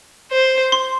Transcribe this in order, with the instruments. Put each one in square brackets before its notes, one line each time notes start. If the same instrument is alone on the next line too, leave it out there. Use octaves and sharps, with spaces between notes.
[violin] C5
[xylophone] C6